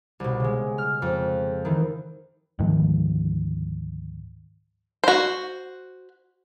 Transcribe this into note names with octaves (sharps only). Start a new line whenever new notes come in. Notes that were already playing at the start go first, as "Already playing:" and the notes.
C2 B2
C#3 G#3
F6
F2 C4
D#3 E3
D2 G#2 D#3 F3
F#4 C5